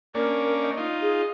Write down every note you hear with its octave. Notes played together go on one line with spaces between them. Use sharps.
A#3 C#4 D4 A#4
D#5
D#4 F4
G#4